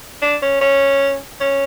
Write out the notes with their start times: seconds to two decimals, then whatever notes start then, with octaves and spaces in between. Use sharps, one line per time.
0.22 D4
0.42 C#4
0.61 C#4
1.41 C#4